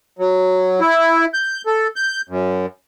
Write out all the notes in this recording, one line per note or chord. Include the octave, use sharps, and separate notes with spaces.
F#3
E4
G6
A4
G6
F#2